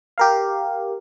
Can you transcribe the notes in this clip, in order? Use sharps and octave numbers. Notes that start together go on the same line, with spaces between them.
G4 A#4 F5